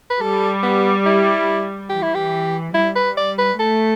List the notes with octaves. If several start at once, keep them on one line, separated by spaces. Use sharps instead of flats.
B4
G3 A4
B3
E4
E3 G4
E4
G4
G3 E4
B4
D5
B4
A3 A4